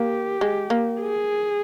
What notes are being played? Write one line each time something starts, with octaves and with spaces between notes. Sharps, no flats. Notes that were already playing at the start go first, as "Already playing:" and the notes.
Already playing: A#3 G4
G#3
A#3
G#4